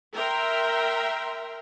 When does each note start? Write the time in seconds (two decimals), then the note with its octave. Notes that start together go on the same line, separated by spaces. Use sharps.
0.16 A#4 E5 G5 A#5 C6